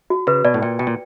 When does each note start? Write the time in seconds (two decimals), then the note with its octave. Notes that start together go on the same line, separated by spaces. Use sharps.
0.10 F#4
0.27 C#3 B4
0.45 B2 D5
0.54 A2
0.62 A#2 G5
0.79 B2 G5
0.87 A#2